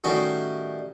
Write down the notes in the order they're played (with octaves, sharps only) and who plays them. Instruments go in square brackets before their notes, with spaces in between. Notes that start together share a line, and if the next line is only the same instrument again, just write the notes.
[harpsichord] A2 D#3 G3 C#4 D#4 F#4